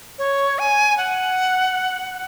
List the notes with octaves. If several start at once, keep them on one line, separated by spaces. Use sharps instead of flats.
C#5
G#5
F#5